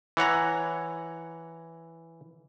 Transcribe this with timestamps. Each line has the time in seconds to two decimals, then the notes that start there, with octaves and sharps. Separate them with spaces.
0.17 E3 C#5 F#5 A#5